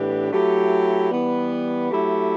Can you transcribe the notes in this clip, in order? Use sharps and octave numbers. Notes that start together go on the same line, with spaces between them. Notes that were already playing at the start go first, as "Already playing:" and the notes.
Already playing: A2 E3 B3 D4 G4
F#3 A3 E4 G4
E3 G3 B3
F#3 A3 E4 G4